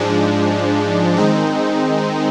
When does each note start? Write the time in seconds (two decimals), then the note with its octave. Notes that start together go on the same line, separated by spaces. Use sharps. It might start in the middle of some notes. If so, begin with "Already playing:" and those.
Already playing: G#2 F3 G#3 D4
1.17 D#3 G#3 C4 D#4